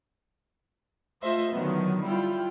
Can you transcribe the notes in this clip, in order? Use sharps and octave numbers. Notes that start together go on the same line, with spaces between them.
A3 F4 C5 D#5 E5
D3 D#3 F#3 B3
G3 E4 F4 G5